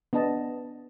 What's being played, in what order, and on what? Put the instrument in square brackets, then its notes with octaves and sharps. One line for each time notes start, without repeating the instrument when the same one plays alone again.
[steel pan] B3 D4 D#5 A5